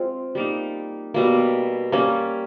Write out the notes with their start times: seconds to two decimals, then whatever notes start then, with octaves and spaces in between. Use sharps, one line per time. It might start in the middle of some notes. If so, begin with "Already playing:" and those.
Already playing: G#3 C4 F4
0.35 G3 A#3 D#4
1.14 B2 G3 A#3
1.92 G3 A#3 C#4